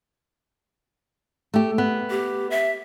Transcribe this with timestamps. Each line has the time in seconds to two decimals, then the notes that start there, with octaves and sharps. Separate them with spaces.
1.54 A3 G4
1.78 B3
2.10 G4
2.50 E5